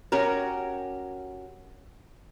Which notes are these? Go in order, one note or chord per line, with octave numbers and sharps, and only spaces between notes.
C#4 F#4 G4 A#4